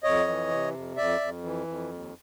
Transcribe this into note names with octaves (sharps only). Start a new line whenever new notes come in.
F2 C#5 D#5
E3
C3
F2
F2 D5 E5
F2
E3
F2
D#2